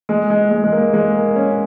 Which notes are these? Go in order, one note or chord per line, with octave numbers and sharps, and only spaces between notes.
G#3
G#3
G#3
G#3
A#3
G#3
A#3
C#4